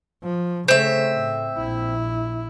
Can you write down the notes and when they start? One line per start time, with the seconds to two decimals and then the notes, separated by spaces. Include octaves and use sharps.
0.24 F3
0.68 C#3 A3 C4 E5
1.15 A2
1.58 A#1 E4